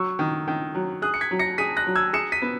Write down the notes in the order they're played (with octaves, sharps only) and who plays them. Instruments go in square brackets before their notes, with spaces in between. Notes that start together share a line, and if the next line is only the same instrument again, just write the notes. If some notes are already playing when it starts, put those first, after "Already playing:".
Already playing: [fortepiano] F#3 [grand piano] C#6 E6
[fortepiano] D#3
D#3
F#3
[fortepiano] G#4 [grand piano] D#6 F#6
[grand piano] C#7
G#6 B6
[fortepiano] F#3
[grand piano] A#6 C#7
[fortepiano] G#4 [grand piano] B6 D#7
[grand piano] F#6 A#6
[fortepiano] F#3
[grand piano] E6 G#6
[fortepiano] G#4 [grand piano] C#7 E7
[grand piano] B6 D#7
[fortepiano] B3